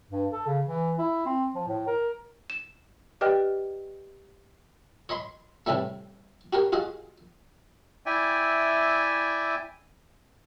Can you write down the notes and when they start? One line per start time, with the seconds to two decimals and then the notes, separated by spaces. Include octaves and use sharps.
0.10 G2
0.32 A4
0.47 C#3
0.66 E3
0.98 E4
1.26 C4
1.55 F3
1.67 A2
1.87 A#4
2.50 E7
3.21 G4 B4 D5 D#5 G5 F6
5.09 C#5 D#5 B5 C6
5.66 A2 C3 E3 G3 A3
6.53 F#4 G4 A#4 C#5
6.72 F4 F#4 G#4 D#5
8.06 E4 D5 E5 G5 G#5